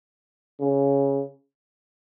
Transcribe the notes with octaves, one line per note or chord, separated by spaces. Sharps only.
C#3